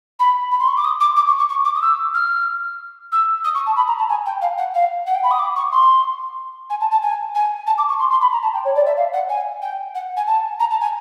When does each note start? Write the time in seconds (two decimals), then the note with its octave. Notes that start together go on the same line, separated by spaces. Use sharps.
0.19 B5
0.51 B5
0.60 C6
0.68 C#6
0.77 D6
0.84 D#6
1.00 D6
1.16 D6
1.27 C#6
1.38 C#6
1.49 C#6
1.65 D6
1.75 D#6
1.82 E6
2.14 F6
3.12 E6
3.44 D#6
3.55 C#6
3.66 A5
3.76 B5
3.87 A#5
3.98 A5
4.09 G#5
4.26 G5
4.41 F5
4.58 F#5
4.74 F5
5.07 F#5
5.15 G5
5.23 B5
5.31 D#6
5.39 D6
5.56 C#6
5.72 C6
6.70 G#5
6.80 A5
6.91 A5
7.02 G#5
7.35 G#5
7.67 A5
7.78 D6
7.89 C#6
7.99 C6
8.10 C6
8.21 B5
8.32 A#5
8.43 A5
8.54 G5
8.65 C#5
8.76 D5
8.86 E5
8.97 F5
9.13 F#5
9.29 G#5
9.62 G5
9.95 F#5
10.17 G#5
10.27 A5
10.60 A#5
10.71 A5
10.81 G#5